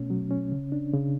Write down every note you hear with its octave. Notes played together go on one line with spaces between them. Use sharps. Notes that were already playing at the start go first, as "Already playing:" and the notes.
Already playing: B2 A3 C#4
F#3
C#4
C#3
D4
C#3